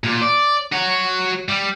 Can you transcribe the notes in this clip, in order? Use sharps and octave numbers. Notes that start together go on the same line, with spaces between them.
A#2
D5
F#4 C#5
G3